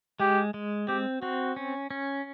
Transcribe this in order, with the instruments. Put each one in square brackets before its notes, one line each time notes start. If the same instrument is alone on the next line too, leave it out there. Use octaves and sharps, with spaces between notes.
[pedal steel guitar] G#3 [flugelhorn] G4
[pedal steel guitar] G#3
[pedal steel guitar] C4 [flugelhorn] G4
[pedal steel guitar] C4 [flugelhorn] F#4
[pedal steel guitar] C#4
C#4